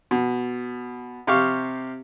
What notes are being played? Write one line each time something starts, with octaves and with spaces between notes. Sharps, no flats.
B2
C3 G4 F5 C#6